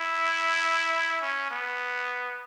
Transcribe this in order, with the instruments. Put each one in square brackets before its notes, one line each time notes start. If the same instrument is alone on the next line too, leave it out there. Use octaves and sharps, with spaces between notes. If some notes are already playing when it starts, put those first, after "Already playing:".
Already playing: [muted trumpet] E4
C#4
B3